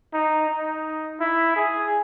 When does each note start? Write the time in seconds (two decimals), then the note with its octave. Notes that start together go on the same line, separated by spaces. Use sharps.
0.13 D#4
0.49 D#4
1.20 E4
1.56 G#4